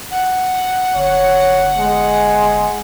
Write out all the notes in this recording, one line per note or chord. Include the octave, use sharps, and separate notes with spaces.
F#5
G1 C#5
G#3